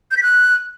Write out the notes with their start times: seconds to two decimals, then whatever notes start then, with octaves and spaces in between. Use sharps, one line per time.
0.11 G6
0.17 B6
0.23 F#6